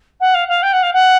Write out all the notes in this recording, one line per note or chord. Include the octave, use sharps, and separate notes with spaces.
F#5
F5
F5
G5
F#5
F5
F#5